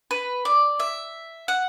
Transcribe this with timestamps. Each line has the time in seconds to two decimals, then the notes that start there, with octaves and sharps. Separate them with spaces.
0.11 B4
0.45 D5
0.80 E5
1.48 F#5